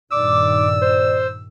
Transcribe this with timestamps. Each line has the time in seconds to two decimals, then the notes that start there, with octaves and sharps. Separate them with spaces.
0.12 G2 A#2 D#3 D5 D6 E6
0.82 C5